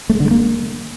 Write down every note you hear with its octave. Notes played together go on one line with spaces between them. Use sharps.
A3
G#3
D3
G#3
A#3